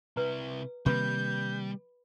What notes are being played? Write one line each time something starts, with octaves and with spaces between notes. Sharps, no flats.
C3 E4 B4 A#5
C3 D#3 G3 A#3 B4 B5 G6